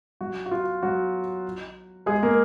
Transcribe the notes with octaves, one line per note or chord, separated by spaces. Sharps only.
F#3 F#4
F#4
F4
F#3 F#4
G#3 G#4
A#3 A#4